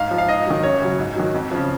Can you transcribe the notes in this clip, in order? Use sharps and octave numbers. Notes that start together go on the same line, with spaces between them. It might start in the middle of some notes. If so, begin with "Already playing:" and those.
Already playing: G#2 F5
F3
F5
G#2 D#5
D#3 F#3
F#2 C#5
C#3 F#3
G#2
D#3 F#3
F2
C#3 F3